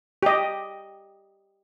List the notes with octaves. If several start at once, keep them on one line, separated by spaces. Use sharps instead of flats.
G4 D#5